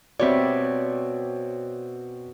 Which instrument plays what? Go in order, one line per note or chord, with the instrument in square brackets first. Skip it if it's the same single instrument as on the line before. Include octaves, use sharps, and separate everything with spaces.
[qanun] B2 G3 [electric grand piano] C4 D5 [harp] C#5 E5